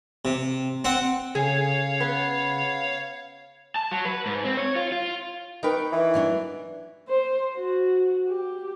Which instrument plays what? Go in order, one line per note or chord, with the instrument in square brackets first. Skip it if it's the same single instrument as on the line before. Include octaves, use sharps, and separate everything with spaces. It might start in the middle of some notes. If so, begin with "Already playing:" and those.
[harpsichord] C3
C4 F#5
[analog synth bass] C#3 [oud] G#4 [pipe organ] C#5 F5
[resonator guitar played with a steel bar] B3
[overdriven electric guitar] A5
F#3
B4
G#2
C4
C#5
F4
F4
[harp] D#4 B4 C#6 [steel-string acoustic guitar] A#4 G5
[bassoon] E3
[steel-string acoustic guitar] G2 F#3 D4
[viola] C5
F#4
G4